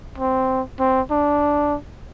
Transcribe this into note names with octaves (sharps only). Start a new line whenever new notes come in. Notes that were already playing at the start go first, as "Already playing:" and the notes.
C4
C4
D4